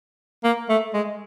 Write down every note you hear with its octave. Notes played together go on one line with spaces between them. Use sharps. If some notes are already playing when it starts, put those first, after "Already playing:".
A#3
A3
G#3